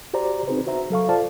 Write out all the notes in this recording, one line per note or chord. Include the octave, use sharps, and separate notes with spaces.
F#4 G4 C5 D5 A#5
C4 D#4 F#4 G#4 B4 C5
F#4 C5 E5 A#5
F#3 A4 F5 C#6
F4 A4 C5 D5 F5 A5